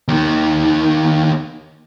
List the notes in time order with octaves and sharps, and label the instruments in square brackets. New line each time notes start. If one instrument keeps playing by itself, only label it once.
[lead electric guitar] D#2 D#3